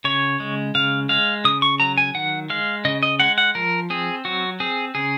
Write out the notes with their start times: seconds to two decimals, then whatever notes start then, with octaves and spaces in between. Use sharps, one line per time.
0.04 C#3 C#5
0.40 G#3
0.75 C#3 F5
1.09 G#3 F5
1.45 C#3 D#6
1.62 C#6
1.80 F#3 A#5
1.98 G#5
2.15 D#3 F#5
2.50 G#3 F5
2.85 C#3 D#5
3.03 D#5
3.20 G#3 F#5
3.38 F#5
3.55 F3 A#4
3.90 C4 G#4
4.25 F#3 F#4
4.60 C4 G#4
4.95 C#3 G#4